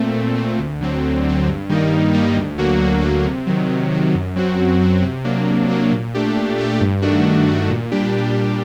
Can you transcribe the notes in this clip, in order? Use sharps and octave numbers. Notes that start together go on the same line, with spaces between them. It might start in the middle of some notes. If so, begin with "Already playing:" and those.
Already playing: A#2 A3 C4
A#2
A3 C4
D2
D3 F#3 C4
D2
D3 F#3 C4
G2
D#3 G3 A#3 D#4
G2
D#3 G3 A#3 D#4
D2
D3 F#3 A#3 F#4
D2
D3 F#3 A#3 F#4
C3
D#3 F#3
C3
D#3 F#3
F#2
F#3 C4 F#4
F#2
F#3 C4 F#4
C3
F#3 A#3 D4
C3
F#3 A#3 D4
A#2
A3 D4 G4
A#2
A3 D4 G4
G2
D#3 A3 D4 F#4
G2
D#3 A3 D4 F#4
A#2
G3 D4 G4
A#2
G3 D4 G4